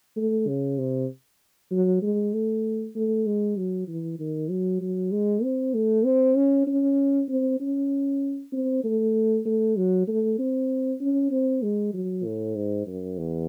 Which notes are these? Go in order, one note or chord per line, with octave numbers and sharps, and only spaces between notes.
A3
C#3
C3
F#3
G#3
A3
A3
G#3
F#3
E3
D#3
F#3
F#3
G#3
C4
A3
C4
C#4
C#4
C4
C#4
C4
A3
A3
F#3
A3
C4
C#4
C4
G#3
F#3
A2
G#2
F#2
E2